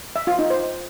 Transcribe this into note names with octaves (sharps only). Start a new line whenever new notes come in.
E5
F4
D#4
C5